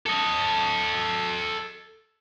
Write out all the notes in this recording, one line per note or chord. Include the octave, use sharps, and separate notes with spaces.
A4 D#5